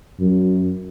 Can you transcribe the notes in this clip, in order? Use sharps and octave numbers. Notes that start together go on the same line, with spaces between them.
F#2